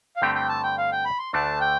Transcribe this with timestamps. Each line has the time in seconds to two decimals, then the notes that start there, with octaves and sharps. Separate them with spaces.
0.16 F5
0.22 G2 D3 A3 C4 G4 G5
0.35 G5
0.49 A5
0.63 G5
0.78 F5
0.92 G5
1.05 B5
1.19 C6
1.33 D2 D3 A3 D4 A5
1.60 G5